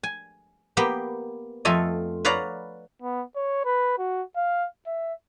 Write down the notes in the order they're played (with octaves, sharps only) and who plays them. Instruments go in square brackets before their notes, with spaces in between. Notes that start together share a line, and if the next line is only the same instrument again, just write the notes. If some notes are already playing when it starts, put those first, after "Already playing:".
[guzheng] G#5
A#3 B3 G4 G5
F2 A3 F4 A4 D#5 G#5
B4 C#5 D5 F5 F#5 A#5
[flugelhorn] B3
C#5
B4
F#4
F5
E5